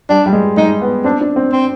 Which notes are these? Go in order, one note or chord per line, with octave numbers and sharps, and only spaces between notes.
G3 D4
G3
G#3
G#3 D#4
B3
C4 D4
D4
C4
C4